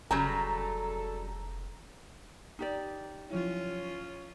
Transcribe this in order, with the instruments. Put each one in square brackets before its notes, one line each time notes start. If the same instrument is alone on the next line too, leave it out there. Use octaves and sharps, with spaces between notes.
[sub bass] F1 [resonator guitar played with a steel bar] C#3 F#3 G3 [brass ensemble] A4 [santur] A#5
[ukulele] D#4 G4 D5
[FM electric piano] F3 F#3 E4 [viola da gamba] C#4 F4 [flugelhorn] C#5